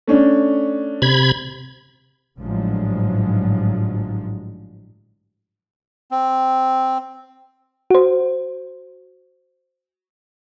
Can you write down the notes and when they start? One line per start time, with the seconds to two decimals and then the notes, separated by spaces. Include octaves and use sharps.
0.07 A3 C#4 D4
1.02 C3 B5 G#6
2.38 A1 G#2 D3 F3 F#3 G#3
6.11 C4
7.90 F#4 C5